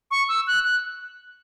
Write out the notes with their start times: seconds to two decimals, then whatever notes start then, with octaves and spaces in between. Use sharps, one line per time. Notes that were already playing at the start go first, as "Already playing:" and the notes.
0.11 C#6
0.29 E6
0.47 F#6
0.64 F#6